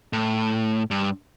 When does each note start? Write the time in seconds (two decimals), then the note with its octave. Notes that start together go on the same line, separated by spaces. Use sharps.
0.13 A2
0.91 G2